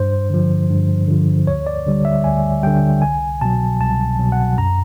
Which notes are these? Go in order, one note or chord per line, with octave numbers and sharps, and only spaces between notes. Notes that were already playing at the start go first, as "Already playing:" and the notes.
Already playing: G2 C5
D3 F3
G2
D3 F3
D2 C#5
D5
D3 G3
E5
D2 G#5
D3 G3 G5
C2 G#5
B2 F#3 A5
C2 A5
B2 F#3
F#5
F#2 A#5